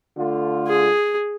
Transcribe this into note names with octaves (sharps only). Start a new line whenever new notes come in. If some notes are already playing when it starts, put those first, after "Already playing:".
D3 A3 F4
G#4